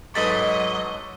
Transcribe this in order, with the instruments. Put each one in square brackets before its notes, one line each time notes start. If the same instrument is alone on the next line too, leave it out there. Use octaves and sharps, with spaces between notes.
[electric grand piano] G#2 A4 A6 [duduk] F#3 [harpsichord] D#4 B4 B5 [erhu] D#5